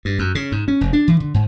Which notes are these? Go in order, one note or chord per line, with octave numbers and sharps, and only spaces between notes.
G2
F#2
C#3
G#2
C#4
F1
D4
E3
D3
G#2